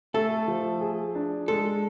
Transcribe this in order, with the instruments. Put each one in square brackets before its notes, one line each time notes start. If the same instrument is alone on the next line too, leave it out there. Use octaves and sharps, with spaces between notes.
[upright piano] A3 [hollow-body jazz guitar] A4
[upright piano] F3
G#4
D4
[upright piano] G#3 [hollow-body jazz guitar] A4